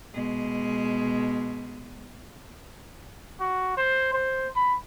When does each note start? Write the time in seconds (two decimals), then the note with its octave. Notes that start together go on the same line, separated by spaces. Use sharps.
0.14 B2 G#3
3.40 F#4
3.77 C5
4.13 C5
4.56 B5